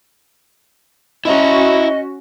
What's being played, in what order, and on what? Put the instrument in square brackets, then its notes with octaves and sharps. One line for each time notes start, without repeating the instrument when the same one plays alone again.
[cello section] C#4 F#4 [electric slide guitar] E4 E5 A#5 [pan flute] D#5